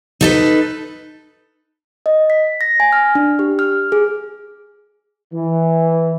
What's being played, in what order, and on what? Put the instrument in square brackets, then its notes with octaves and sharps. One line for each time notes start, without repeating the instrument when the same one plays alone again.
[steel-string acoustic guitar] D#4 A4 B4
[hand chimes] D#5
B6
A#6
G#5
F6
D4
G4
F6
G#4
[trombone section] E3